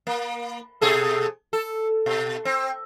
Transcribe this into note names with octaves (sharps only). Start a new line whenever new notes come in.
A#3
B2 G#4 A4
A4
B2
C4